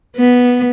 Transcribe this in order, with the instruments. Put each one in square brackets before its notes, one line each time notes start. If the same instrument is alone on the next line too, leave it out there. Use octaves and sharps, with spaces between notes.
[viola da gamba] B3